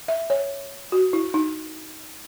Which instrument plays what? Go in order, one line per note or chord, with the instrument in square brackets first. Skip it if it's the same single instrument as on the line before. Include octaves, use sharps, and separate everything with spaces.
[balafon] E5
C#5
F#4
E4
D#4